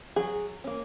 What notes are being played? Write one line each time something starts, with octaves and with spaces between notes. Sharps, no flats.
F#3 G#4
A#3 C#4